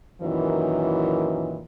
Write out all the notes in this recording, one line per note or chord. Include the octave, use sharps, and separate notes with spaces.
F#2 A#2 D#3 E3